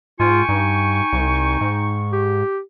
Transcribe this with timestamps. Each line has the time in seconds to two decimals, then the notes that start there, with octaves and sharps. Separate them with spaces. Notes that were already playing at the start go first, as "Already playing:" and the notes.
0.20 G#2 F4 G5 G#5 C#6
0.49 G2 D#4
1.13 C2
1.61 G#2
2.12 G4